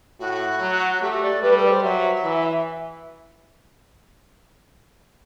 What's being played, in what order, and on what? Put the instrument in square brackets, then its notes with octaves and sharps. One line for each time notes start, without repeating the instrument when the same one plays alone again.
[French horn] A2 [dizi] F#4
[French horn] F#3
[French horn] A3 [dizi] G4
[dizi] D5
[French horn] G3 [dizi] B4
[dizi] A4
D5
C5
[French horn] F#3 [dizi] E5
[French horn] E3